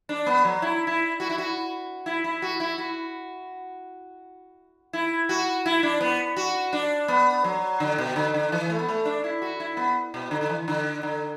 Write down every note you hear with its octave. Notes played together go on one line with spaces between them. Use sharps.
D4
B3
F#3
E4
E4
F#4
E4
F#4
E4
E4
F#4
E4
F#4
E4
F#4
E4
D4
B3
F#4
D4
B3
F#3
D3
B2
D3
D3
E3
A3
B3
A3
D4
E4
F#4
E4
B3
B2
D3
D3
E3
D3
D3